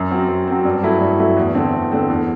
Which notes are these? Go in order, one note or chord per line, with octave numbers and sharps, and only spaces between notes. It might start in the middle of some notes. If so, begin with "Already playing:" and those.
Already playing: F#2
F#3 C4
F#2
F#3 C4
G2
F#3 A3 E4
G2
F#3 A3 E4
E2
D3 A3 C4
E2
D3 A3 C4
E2